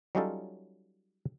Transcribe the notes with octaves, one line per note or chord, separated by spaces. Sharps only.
F#3 G3 C#4 D#4 F4 A4